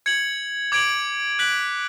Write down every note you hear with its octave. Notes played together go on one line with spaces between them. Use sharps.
G#6 C#7 F#7
D6 G#6 D7 F#7
F#6 B6 D7 F#7